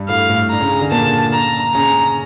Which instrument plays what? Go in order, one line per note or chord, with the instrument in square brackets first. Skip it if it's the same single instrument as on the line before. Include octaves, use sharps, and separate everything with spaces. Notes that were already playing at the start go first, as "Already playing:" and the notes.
Already playing: [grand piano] G2 G3
[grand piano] A2 A3 [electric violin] F5
[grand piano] A2 A3
[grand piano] D4 [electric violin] A#5
[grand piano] C#3 C#4
C#3 C#4
D3 D4
[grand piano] A#2 A#3 [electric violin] A5
[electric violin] A#5
[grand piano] C#3 C#4 [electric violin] A#5